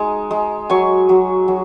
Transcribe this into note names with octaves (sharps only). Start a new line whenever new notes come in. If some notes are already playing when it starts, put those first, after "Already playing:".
Already playing: G#3 D#4 A#5
G#3
F#3 G#5 C#6
F#3
F#3